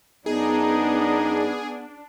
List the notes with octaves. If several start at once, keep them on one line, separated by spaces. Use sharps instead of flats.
F#2 B3 D4 D#4 G#4